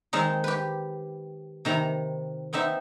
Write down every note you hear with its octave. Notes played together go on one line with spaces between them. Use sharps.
D#3 G#3 C4 D#4
G4 B4
C3 D#3 A#5 B5
B3 C4 D#4 E5